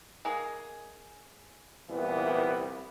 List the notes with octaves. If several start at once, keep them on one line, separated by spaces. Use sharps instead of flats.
G#3 A#3 G#4
C2 A#2 E3 B3